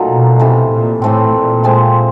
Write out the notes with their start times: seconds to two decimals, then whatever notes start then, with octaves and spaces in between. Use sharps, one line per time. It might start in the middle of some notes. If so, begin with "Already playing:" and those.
Already playing: A#2 F#3 A3 D#4
0.09 B2
0.39 C3 E3 A3
0.71 A#2
1.02 A2 E3 A3 C4
1.33 A#2
1.63 F3 G#3 C4